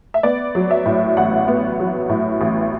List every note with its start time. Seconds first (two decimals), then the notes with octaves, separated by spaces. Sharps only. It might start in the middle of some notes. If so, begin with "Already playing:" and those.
0.14 E5
0.23 B3 D5
0.55 F#3
0.71 E5
0.86 A2
1.17 A1 F#5
1.48 B3
1.80 F#3
2.09 A2
2.41 A1